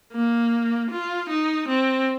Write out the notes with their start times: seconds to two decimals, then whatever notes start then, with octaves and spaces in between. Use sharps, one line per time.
0.13 A#3
0.90 F4
1.29 D#4
1.68 C4